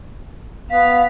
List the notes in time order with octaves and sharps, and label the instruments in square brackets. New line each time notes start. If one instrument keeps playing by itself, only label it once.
[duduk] B3 [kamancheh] F5 [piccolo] B6